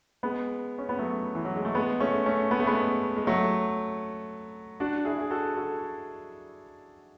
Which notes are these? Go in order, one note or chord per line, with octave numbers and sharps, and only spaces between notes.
G#3 B3
C#4
B3
F#3 A3
E3
F#3
G#3
A3
G#3 B3
A3 C#4
A3 C#4
B3
A3
G#3 B3
G#3
F#3 A3
D4 F#4
E4 G#4
G#4
F#4 A4
F#4 A4